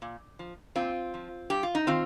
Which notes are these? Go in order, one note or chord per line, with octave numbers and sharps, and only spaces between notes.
A#2
F3
A#2 C4 F4
F3
G2 G4
F4
D#4
D#3 C4 F4